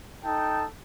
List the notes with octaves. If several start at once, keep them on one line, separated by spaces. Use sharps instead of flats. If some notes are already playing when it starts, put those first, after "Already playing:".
D#4 A4 G5 A5